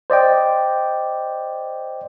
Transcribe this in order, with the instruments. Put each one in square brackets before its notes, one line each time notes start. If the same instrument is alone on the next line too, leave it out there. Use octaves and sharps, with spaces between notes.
[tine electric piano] C5 D5 D#5 G5